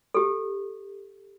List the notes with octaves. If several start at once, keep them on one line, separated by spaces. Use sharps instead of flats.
G4 A4